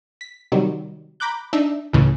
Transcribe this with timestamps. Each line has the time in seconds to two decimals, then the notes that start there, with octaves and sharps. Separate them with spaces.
0.21 B6
0.52 C3 D#3 F#3 G3
1.20 A#5 B5 D6 F#6 G6
1.53 D4 D#4 E5
1.93 C#2 A2 C#3 E3